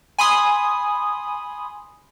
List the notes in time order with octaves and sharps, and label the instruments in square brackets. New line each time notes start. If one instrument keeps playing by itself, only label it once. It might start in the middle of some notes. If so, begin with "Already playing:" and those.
[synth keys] G#5 B5 C6 D#6